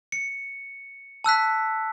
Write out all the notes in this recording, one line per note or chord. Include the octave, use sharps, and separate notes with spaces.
C#7
A5 E6 F#6 B6